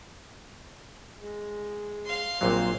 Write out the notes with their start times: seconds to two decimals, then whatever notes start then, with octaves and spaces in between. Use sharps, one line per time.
1.19 G#3
2.06 F5 C6
2.41 A#1 A#2 F#3 A#3 C4 C5